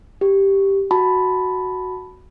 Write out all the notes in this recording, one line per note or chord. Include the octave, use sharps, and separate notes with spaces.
G4
F#4 A5 B5